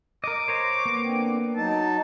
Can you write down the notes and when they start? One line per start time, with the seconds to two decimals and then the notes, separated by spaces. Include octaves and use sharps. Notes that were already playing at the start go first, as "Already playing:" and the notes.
0.24 A#4 D#5 D6
0.48 C5 C#5 A#5
0.86 A#3 B3
1.02 D3 C4
1.57 F#3 D#4 A5